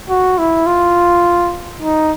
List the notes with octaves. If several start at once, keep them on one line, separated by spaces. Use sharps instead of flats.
F#4
E4
F4
D#4